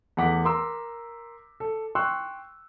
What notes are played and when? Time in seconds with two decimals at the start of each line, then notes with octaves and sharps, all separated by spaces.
0.17 E2 A3 F#5 D6 B6
0.44 A#4 A#5 C6 D6 E6
1.60 A4
1.95 G5 C6 C#6 E6 F#6